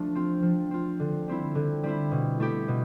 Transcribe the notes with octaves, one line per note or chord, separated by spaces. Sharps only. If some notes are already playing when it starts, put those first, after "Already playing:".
Already playing: F3 A3 D4
C4 F4
F3
C4 F4
D3
G3 C4 E4
D3
G3 C4 E4
B2
A3 E4 G4
B2